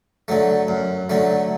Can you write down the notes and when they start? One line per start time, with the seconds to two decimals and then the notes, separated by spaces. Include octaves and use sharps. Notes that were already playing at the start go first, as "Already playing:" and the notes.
0.28 D3 F#3 A3
0.68 F#2
1.10 D3 F#3 A3